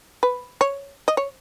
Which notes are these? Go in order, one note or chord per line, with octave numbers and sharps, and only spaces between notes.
B4
C#5
D#5
C#5